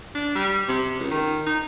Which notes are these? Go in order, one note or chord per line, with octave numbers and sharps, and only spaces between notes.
D4
G3
C3
C#2
D#3
D#4